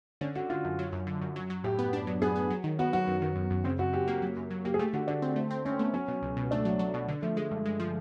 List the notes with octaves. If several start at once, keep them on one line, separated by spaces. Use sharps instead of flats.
D3 C#4
D3 F#4
D3 F4
F#2
F#3
F#2
D3
F#2
F#3
F#3
A2 G4
B3
D4
F#3
B3 G#4
B3
F#3
D#3
B3 F#4
F#3 F#4
F#2
D#3
F#2
F#2
C#3 C4
F#2 F#4
F#2 G4
A#3
F#3
F#2
F#3
A#3 G4
G#4
A3 G4
D3 F#4
D3 D4
C4
A3
C4
C4 C#4
A3 B3
F#3 C#4
B2
C#2
B2
A3 D4
F#3
F#3
B2
D3
F3 A3
G#3 A3
G2
G#3
F3